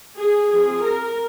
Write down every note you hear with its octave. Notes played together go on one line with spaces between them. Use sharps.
G#4
F3 C4 G#4
A#4